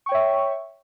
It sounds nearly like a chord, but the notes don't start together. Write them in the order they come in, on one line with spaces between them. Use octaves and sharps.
C#6 G5 C#5 E5